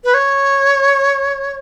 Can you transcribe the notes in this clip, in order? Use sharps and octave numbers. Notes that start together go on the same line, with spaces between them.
B4
C#5